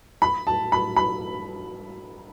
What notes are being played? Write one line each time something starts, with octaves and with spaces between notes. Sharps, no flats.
B5
A5
B5
B5